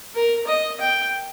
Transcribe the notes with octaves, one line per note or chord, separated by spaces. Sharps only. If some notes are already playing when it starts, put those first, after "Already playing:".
A#4
D#5
G5